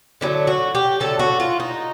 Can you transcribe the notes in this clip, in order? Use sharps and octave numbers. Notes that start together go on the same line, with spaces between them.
D3 F#3 A3 E4
F#4
G4
D3 F#3 A3 A4
F#4
F4
D#4